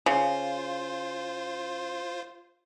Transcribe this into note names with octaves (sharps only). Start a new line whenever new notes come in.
C#3 F4 C5